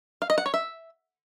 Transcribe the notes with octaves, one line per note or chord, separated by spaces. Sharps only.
F5
D#5
F#5
C#5
E5